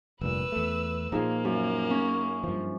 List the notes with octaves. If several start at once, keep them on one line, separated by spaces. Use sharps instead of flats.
F1 G2 A#2 B4 E6
E2 A3
A#2 F3 A#3 D#4 G#4 F5
F#2
C#4
G2 F3